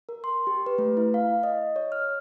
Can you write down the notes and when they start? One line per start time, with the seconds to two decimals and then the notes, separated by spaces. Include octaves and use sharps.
0.09 A#4
0.24 C6
0.47 G4
0.66 B4
0.78 A3
0.97 E4
1.14 F5
1.43 D#5
1.76 C#5
1.92 F6